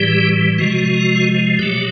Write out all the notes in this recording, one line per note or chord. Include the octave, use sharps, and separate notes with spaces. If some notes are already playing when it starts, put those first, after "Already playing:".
Already playing: A2 E3 G3 G4
C3 F3 G#3 F#4
B2 F#3 A3 G4